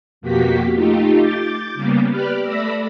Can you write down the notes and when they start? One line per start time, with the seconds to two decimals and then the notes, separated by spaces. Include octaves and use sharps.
0.21 F2 B2 A#3 F#4 G4 B6
0.74 A3 D#4 F4 G4
1.17 D6 G6 A6
1.74 C#3 G3 A#3 B3
2.09 G4 B4 D5 F6 F#6
2.40 A3 D5 B5 E6 A#6